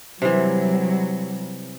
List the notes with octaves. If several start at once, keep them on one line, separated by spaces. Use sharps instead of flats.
C3 E3 F#3 G3